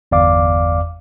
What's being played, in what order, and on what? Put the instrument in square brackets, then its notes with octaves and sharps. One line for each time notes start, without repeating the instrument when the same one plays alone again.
[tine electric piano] G1 E2 D5 F5 D6